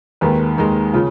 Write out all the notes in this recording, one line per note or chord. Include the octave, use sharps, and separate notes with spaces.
D#2 D#3 G#3 B4
D#2 D#3 G#3
C#3 F4